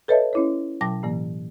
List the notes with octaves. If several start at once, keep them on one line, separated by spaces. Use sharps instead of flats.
A4 B4 C#5 D#5 E5 A5
C#4 E4 C#5
B2 F#3 G5 A5 D6 A#6
A2 E3 A#3